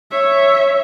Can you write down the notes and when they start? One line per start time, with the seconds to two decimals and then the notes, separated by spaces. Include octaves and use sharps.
0.12 C#5 E5